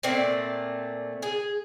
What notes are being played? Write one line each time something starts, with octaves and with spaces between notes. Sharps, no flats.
A#2 A3 C4 D5
G#4